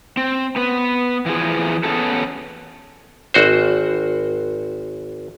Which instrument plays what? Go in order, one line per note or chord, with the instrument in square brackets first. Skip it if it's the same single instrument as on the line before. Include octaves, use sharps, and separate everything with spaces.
[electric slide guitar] C4
B3 B4
E3 F3 G#4
B3 C#4 E4 G4 A4
[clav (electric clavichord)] G#1 F#4 C5